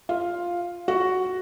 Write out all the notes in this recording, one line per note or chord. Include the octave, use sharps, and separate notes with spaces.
F4
F#4